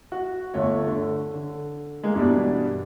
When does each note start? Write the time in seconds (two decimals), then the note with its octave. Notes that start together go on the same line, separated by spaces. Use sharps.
0.12 F#4
0.54 G1 A3 C#5
0.87 D3
1.34 D3
2.03 G#3 A#3
2.15 G2 B2 E3 G3 B3 D4